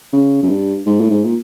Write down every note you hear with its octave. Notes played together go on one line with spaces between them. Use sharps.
C#3
F#2
G2
G#2
A2
G#2
A#2